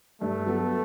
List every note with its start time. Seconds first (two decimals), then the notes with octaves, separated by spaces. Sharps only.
0.21 G2 A3
0.46 F#3 B3 F#4 A4